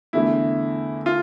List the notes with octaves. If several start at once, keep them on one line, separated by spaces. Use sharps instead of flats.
E2 D3 A3 E4
F4